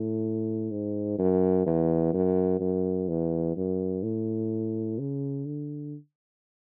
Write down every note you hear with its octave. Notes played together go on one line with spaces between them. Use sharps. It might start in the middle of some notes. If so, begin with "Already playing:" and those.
Already playing: A2
G#2
F#2
E2
F#2
F#2
E2
F#2
A2
C#3
D3